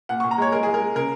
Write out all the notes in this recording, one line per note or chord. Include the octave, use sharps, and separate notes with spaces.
A#2 F#5
A#2 C#6
A#5
G#3 C#5
G#3 A#4
G#3 G#4
A#4
G#3
C#3 A#4